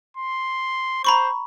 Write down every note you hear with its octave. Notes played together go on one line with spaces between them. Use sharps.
C6
C5 A#5 B5 C#6